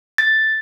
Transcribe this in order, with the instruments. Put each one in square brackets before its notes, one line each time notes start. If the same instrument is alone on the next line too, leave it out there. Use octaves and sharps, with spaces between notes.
[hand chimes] A6